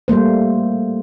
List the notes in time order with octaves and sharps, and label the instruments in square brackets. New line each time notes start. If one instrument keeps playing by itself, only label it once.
[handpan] G3 A3 A#3 C5